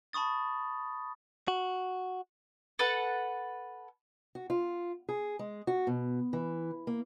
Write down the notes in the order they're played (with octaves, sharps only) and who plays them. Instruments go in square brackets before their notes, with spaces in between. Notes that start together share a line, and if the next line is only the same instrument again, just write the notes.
[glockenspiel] A5 B5 C#6 D#6 A6
[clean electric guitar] F#4
[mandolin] A4 B4 F#5
[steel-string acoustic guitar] F#4
F4
G#4
G#3
F#4
B2
E3
A#3